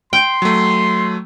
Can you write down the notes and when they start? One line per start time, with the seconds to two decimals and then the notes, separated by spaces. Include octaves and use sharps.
0.13 G5 C6
0.42 F#3 A3